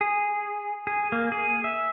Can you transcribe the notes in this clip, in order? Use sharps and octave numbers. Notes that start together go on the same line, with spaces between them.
G#4
G#4
A#3
G#4
E5